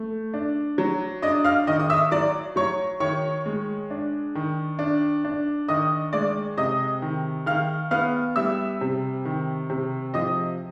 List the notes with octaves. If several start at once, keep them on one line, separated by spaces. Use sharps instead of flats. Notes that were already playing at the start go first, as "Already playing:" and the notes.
Already playing: A3
D4
F#3
D4 D#5 D#6
F5 F6
D#3 D#5 D#6
D#6
E5 E6
F#3 D5 D6
F#3 C#5 C#6
D#3 C#5 C#6
G#3
D4
D#3
D4
D4
D#3 D#5 D#6
G#3 D5 D6
C3 D#5 D#6
D#3
D#3 F5 F6
B3 F5 F6
G3 E5 E6
C3
D#3
C3
F3 D#5 D#6